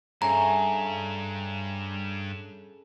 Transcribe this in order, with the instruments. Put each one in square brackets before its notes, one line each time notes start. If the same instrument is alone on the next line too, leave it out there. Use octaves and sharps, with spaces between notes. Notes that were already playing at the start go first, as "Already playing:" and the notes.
[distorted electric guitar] G2 [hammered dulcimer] C#3 A4 E5 [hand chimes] A#5